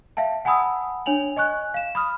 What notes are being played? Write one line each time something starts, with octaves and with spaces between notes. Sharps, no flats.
E5 F5 G5 A5
F#5 G#5 A5 B5 D#6 E6
D4 C#5 G#5 F7 F#7
D#5 G#5 C#6 F#6
F5 E7
B5 D#6 F6